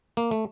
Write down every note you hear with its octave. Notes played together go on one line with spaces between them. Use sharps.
A#3
A3